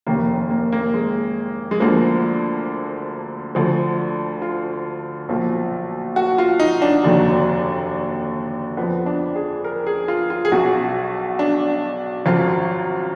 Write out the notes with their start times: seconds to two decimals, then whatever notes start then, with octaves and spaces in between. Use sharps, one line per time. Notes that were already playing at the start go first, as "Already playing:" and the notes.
0.07 F1 D#2 D#3 A#3
0.50 A#3
0.72 A#3
0.94 G#3
1.71 G#3
1.80 D2 D3 F3 A#3
3.55 D2 D3 F3
4.42 F4
5.29 B1 A#2 F3
6.16 F#4
6.38 F4
6.60 D#4
6.82 D4
7.03 F1 D#2 D3 F#3
8.77 F2 F3 B3
9.06 D4
9.35 G#4
9.64 A#4
9.87 G#4
10.08 F4
10.30 F4
10.45 G#4
10.52 B1 B2 F#3 F#4
11.39 D4
12.26 G#1 F#2 F3 F4